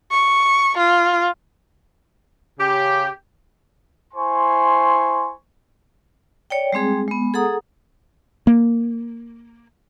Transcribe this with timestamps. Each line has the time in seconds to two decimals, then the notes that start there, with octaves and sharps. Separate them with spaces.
0.11 C#6
0.78 F4
2.59 C#3 G4
4.14 E4 C5 G#5 C6 C#6
6.50 C#5 D5 G5
6.73 G3 G#3 C4 G#4
7.08 G#3 B3
7.34 G#4 A4 F#5 A#5 D#6
8.47 A#3